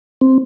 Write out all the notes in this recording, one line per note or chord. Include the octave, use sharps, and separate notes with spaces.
C4